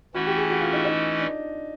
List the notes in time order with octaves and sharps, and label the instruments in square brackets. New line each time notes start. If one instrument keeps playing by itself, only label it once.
[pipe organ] E3 A3 C#4 E4 [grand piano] F#4
[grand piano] G4
G#4
F#4
F4
D#4
D#4
D4